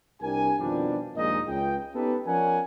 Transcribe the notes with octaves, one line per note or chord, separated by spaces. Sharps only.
C2 D4 G4 A#4 G#5
F2 B2 D#3 F3 G3 D4
A#1 D#2 A#2 G#3 D#4 D#5
C#2 G5
B3 C#4 D#4 G4 A4 B4
F3 C#4 A#4 D5 F#5 G#5